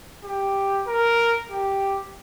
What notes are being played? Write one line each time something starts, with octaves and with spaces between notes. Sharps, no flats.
G4
A#4
G4